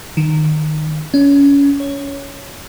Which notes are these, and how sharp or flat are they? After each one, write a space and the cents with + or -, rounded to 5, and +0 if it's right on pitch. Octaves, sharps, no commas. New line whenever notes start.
D#3 -20
C#4 +25
C#5 +5